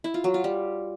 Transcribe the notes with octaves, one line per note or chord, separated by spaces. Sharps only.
E4
F4
F#3
F4
G3